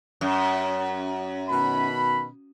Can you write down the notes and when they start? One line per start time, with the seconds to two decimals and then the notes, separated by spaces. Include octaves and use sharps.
0.21 F#2
1.49 B2 D#3 B5